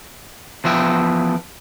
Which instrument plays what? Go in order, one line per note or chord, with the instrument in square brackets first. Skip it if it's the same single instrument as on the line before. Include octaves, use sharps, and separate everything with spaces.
[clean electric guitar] E2 F3 B3 E5 G5